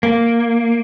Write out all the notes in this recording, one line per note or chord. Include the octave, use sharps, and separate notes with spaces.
A#3